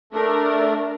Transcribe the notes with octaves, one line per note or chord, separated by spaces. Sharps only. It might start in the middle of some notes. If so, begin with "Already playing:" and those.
A3 D4 A#4